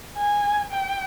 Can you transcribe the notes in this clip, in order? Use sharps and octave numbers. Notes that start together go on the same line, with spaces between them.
G#5
G5